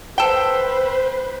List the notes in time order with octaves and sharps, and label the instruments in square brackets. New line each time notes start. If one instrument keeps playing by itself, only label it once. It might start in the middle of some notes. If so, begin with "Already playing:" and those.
[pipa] A4 G5 [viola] B4 C5